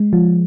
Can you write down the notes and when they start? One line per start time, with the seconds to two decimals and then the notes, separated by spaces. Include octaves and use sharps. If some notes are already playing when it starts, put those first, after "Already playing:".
Already playing: G#3
0.13 F3